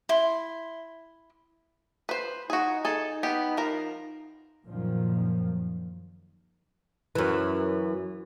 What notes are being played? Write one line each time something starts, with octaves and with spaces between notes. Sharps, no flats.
E4 C6
B4 C5
D#4 F#4 G#4
G#4 A4
B3 G4
F3 A#4
F#2 A#2 D#3 F3
F#2 E3